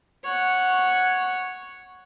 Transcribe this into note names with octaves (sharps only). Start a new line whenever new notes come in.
C#5 F#5